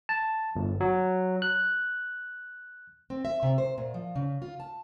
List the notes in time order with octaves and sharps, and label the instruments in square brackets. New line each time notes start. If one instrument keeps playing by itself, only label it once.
[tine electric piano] A5
G1
F#3
F#6
[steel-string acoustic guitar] C4
E5
C3
C5
A#2
F3
C#3
F4
A5